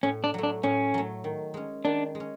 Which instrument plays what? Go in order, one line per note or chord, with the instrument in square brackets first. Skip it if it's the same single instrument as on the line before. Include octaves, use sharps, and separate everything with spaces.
[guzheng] A2 [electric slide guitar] C#4
[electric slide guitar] D4
[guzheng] F#3 A3
[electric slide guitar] D4
[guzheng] A2 [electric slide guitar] C#4
[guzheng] F#3 A3
D#3
G#3 C#4
[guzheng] D#3 [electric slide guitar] D4
[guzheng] G#3
C#4